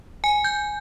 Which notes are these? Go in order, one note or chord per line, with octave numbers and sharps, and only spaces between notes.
G#5
G6